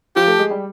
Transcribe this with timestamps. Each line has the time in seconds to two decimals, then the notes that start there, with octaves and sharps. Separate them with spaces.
0.16 F3 F4 G4
0.28 A3 A4
0.39 G#3 G#4
0.50 G3 G4